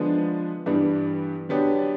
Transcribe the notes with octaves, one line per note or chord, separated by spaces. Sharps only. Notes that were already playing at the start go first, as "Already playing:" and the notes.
Already playing: D3 F3 G#3 B3 D4
G2 E3 G3 B3 D4
D3 F#3 B3 D4 G4